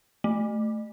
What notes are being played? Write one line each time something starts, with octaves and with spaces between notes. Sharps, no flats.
A3